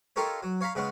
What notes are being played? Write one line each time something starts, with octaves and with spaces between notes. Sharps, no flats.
D#4 F4 G4 A4 A#4 C#5
F#3
C#5 F5 A#5 B5
C#3 G#3 B3 C#4